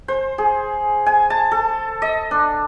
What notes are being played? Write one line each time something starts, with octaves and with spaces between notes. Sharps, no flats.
C5
G#4
G#5
A5
A4
D#5
D4